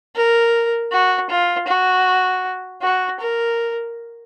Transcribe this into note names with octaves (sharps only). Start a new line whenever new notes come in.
A#4
F#4
F4
F#4
F#4
A#4